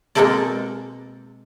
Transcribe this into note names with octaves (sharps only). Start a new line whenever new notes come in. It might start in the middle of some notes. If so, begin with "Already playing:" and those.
B2 G#3 A#3 C4 A4 D5